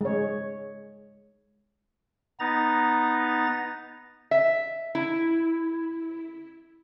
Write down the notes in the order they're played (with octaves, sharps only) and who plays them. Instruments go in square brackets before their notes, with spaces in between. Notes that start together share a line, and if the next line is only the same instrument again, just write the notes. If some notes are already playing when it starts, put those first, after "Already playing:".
[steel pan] G#3 C#5
[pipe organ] B3 D#4 A#5 A6
[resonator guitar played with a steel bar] E5
E4